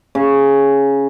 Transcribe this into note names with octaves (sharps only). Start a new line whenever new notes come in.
C#3